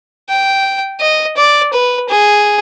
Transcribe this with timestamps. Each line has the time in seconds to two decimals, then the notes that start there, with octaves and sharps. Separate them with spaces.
0.29 G5
1.01 D#5
1.37 D5
1.73 B4
2.09 G#4